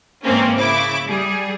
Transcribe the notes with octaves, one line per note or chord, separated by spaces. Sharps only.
G#2 E3 A#3 C4 C#4
C#3 E4 D6
G3 G#4